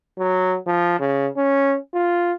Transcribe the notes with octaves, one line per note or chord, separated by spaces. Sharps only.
F#3
F3
C#3
C#4
F4